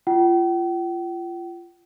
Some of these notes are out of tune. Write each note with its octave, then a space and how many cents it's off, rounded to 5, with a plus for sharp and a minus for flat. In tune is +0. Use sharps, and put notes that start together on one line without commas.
F4 -25 G5 -40